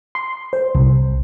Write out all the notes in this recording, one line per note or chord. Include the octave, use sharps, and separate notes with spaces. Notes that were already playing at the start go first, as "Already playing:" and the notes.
C6
C5
C2